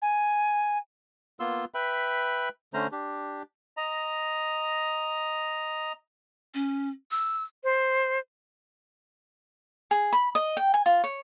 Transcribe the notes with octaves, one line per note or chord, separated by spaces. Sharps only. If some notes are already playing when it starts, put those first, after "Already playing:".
G#5
A#3 B3 F4 C6 E6
B4 E5 G5 B5
D3 A3 C#4 C5 A#5
D4 G4
D#5 A#5
C#4
E6
C5
G#4
B5
D#5
G5
G#5
F4
C#5